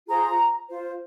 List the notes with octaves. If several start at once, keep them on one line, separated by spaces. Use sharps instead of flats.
F4 G#4 C5 A#5
F4 C5